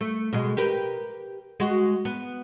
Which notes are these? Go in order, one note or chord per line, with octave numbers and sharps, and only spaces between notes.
A3
B2 G#3
G4 A#4 B4
G#3 F#4
B3